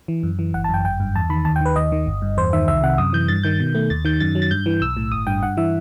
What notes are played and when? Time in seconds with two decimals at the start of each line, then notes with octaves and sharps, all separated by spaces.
0.08 E3
0.23 F#2
0.39 E3
0.54 G1 F#5
0.64 A5
0.69 F#2 G5
0.84 G1 G5
1.00 G2
1.16 E2 A5
1.30 D#3 B5
1.45 D#2 A5
1.56 G5
1.61 D#3 B4
1.76 D#2 D#5
1.92 D#3
2.06 G1
2.22 G2
2.37 E2 C5
2.53 D#3 E5
2.67 C2 E5
2.82 C3 F#5
2.98 F#2 D#6
3.13 E3 G6
3.28 G2 A6
3.43 D#3 G6
3.60 B2
3.75 A3
3.90 D#2 A6
4.05 D#3 G6
4.20 F#2 A6
4.35 F#3
4.42 A6
4.51 G2 G6
4.66 E3
4.81 B1 E6
4.97 A2
5.12 G1 D#6
5.27 G2 G5
5.43 G2 F#5
5.57 E3 E5